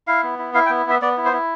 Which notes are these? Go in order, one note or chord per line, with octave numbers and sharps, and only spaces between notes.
E4 F5
B3
E4
E4 F5
G5
B3
B3 E5
B3 D5
E4
C5
E4